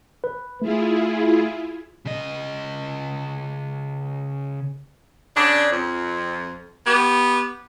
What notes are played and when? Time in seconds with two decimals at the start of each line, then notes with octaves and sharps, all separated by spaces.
0.24 B4
0.62 A3 E4 F4 G#4
2.05 C#3 D#5
5.36 C#3 D4
5.71 F2
6.86 B3 G4